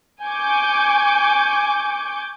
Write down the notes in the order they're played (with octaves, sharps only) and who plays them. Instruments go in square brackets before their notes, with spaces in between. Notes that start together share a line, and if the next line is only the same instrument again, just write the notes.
[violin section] G#5 C#6 D6 G6